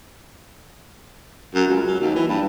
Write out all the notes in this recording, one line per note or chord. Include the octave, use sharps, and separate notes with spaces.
F#2
C#2
F#3
D#2
E3
G2